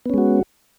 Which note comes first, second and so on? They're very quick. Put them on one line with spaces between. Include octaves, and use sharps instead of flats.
B3 C#4 G#3 F#4